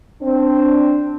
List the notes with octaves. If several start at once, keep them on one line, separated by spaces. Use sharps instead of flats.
C4 D4